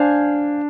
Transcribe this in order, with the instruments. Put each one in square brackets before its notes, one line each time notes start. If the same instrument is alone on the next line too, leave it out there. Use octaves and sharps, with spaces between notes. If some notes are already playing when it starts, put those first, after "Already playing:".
Already playing: [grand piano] D4 [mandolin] C5 F5 G#5